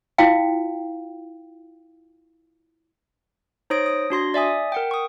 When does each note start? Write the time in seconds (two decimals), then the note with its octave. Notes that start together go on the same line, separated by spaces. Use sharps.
0.18 E4 F4 F5 G5
3.70 D#4 C5 C#5 D#6 A#6 D7
3.86 D#6
4.10 D4 F#4 C6 A#6
4.34 D5 E5 G#5 D#6
4.72 A#4 F#5 G5
4.91 C#6 D#6